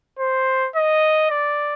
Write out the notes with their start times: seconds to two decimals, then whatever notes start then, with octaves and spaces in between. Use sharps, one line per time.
0.19 C5
0.76 D#5
1.31 D5